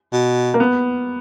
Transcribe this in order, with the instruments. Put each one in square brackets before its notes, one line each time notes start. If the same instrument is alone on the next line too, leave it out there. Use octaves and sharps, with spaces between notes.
[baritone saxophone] B2
[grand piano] A#3
B3